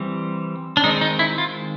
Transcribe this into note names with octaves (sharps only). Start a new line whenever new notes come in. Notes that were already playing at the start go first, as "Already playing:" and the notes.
Already playing: E3 G3 C4
D4
D#3 G#3 C4 D#4
D#4
E4
F4